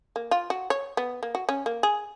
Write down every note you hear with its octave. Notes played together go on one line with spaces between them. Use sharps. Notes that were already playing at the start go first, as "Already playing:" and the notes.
A#3
F4
F#4
C#5
B3
A#3
F#4
C#4
A#3
G#4